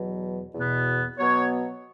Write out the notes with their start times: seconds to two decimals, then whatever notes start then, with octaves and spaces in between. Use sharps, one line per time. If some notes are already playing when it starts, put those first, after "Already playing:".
Already playing: E2 B2 F#3
0.55 E2 B2 B3
1.18 B2 F#3 B3 C#5